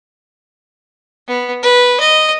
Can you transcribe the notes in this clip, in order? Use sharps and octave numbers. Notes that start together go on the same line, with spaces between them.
B3
B4
D#5